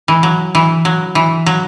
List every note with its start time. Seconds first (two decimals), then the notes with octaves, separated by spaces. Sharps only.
0.08 E3
0.23 F#3
0.55 E3
0.85 F#3
1.15 E3
1.46 F#3